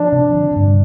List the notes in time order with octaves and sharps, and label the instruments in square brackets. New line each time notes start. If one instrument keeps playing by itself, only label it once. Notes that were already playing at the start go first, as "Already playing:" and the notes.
Already playing: [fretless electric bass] F3 [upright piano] D4
[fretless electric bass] C3
D3
G2